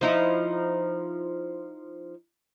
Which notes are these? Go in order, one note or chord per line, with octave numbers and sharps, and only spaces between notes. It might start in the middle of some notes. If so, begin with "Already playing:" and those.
F3 D#4 E4